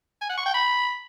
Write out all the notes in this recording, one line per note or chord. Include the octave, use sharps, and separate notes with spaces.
G#5
F#5
C#6
G5
B5